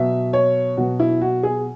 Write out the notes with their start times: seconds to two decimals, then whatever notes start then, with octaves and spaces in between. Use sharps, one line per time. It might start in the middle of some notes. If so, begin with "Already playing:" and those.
Already playing: B2 F#3 E5
0.33 C#5
0.77 B2 F#3 F#4
1.00 E4
1.21 F#4
1.43 G#4